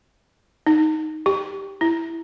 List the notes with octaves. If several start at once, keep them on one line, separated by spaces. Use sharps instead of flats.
D#4
G4
E4